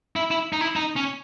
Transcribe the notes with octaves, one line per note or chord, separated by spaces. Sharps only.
E4
E4
D#4
E4
D#4
C#4